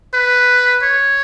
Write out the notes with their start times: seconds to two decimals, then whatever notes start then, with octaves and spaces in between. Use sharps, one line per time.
0.14 B4
0.83 C#5